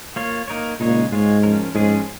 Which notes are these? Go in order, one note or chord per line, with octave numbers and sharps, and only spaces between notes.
A#3 F4 C#5
A#3 D#4 A#4 C#5
A#2 C#3 G#3 D#4 C#5
G#2 G#3 F4 G#4 C#5
F3 C#4 A#4
G#2 F3 G#3 C#4 G#4